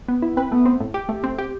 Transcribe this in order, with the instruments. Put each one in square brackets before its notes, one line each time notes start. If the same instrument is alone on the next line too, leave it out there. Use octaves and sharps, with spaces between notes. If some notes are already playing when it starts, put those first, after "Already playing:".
[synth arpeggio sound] B3
E4
[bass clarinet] C4 [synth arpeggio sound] B4
[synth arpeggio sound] A3 [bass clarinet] B3
[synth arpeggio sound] C4
A2
G4
A3
C4
G4